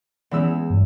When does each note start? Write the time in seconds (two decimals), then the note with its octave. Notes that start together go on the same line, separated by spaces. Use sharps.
0.31 E2 E3 G#3 C#4 E6
0.70 G2